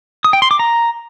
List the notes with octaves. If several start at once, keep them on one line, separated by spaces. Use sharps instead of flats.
D#6
G5
C6
D6
A#5